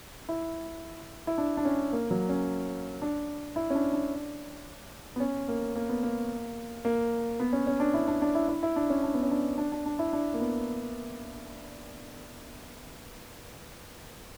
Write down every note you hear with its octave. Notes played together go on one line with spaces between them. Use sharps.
E4
E4
D4
D4
C#4
A#3
F#3
C#4
D4
E4
C#4
D4
D4
B3
C#4
A#3
A#3
B3
A#3
A#3
B3
C#4
C#4
D4
E4
D4
D4
E4
E4
E4
D4
C#4
D4
B3
C#4
D4
D4
D4
D4
E4
D4
A#3
B3